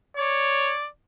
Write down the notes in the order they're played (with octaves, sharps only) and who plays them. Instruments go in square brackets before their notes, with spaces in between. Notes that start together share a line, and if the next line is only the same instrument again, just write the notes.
[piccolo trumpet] C#5 [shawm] D5